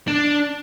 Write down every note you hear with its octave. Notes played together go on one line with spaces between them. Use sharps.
D4